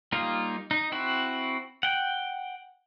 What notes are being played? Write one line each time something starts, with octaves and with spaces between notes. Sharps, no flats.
G3 A#3 D#4 F4
D#4
C4 E4 F#4
F#5 G5